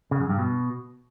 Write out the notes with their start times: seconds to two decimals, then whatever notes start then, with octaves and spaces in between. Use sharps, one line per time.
0.11 C#3
0.20 F#2
0.29 G2
0.38 B2